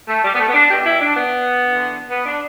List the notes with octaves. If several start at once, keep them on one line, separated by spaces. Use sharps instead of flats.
A3
G3
B3
A3
B3
D4
E2 B2 G4
E4
D4
B3
E2 D3
B3
D4